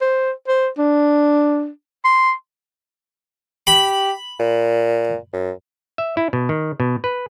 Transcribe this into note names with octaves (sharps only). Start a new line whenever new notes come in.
C5
C5
D4
C6
G4 B5
A#2
F#2
E5
E4
B2
D#3
B2
B4